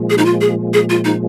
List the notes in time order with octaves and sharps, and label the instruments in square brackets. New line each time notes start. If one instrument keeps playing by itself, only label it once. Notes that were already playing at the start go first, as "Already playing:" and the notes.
Already playing: [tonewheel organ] A#2 F3 G#3
[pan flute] G#4
D#4
F4
G#4
G#4
F4
D#4